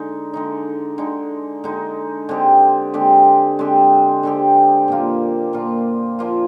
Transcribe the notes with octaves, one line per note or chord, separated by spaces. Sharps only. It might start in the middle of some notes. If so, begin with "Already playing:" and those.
Already playing: D3 G#3 D#4
D3 G#3 D#4
D3 G#3 D#4
D3 G#3 D#4
D3 G#3 C4 G4
D3 G#3 C4 G4
D3 G#3 C4 G4
D3 G#3 C4 G4
A#2 F3 A#3 F4
A#2 F3 A#3 F4
A#2 F3 A#3 F4